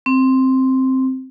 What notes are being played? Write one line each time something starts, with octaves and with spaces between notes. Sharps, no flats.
C4